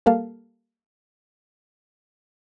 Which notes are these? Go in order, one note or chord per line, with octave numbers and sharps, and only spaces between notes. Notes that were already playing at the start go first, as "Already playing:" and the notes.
G3 A#3 A4 F5